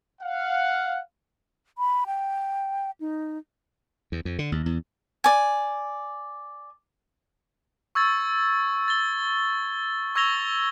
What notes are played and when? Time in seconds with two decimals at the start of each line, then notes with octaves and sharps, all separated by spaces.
0.21 F5 F#5
1.78 B5
2.07 G5
3.00 D#4
4.12 E2
4.25 F2
4.39 D3
4.52 D#2
4.66 E2
5.24 D5 G#5
7.95 C#6 E6 G#6 A6
8.88 A6 G7
10.16 C#6 E6 G#6 A#6 F7 G7